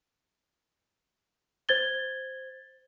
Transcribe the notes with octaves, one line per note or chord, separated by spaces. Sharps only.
C5 G#6 A6 G7